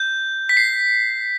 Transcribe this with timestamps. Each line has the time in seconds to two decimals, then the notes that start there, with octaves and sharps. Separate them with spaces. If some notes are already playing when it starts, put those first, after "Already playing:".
Already playing: G6
0.49 B6
0.57 C7